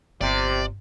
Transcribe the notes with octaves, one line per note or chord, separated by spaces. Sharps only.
G1 C3 D5